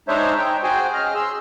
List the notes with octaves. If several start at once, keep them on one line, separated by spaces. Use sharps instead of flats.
G#3 D4 D#4 C5 C#5 E5
D#4 G5
F#4 G#4 C5 G5 G#5
C#3 G#4 D#5 F6
G#4 C6 E6